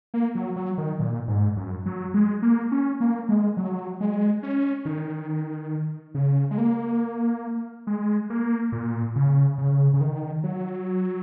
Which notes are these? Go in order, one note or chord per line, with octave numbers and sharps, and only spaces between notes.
A#3
F#3
F#3
D#3
A#2
G#2
F#2
F#3
G#3
A#3
C#4
A#3
G#3
F#3
G#3
C#4
D#3
C#3
G#3
A#3
G#3
A#3
A#2
C#3
C#3
C#3
D#3
F#3